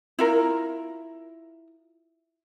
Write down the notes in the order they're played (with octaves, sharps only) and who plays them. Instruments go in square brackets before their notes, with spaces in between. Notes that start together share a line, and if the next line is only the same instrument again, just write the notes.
[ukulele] E4 F4 A#4